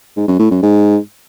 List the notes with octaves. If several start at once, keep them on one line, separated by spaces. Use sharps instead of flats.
G#2
F#2
A2
F#2
G#2